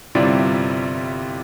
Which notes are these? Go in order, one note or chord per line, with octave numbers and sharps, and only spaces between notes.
G1 C3 G3 E4 F4 D5